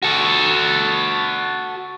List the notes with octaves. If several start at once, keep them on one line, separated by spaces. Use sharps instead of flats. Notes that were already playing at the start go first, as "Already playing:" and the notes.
F#4 A4